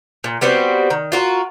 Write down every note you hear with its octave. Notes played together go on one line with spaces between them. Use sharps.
A#2
G3 B3 C4 F#4
D#3
F4 F#4 A#4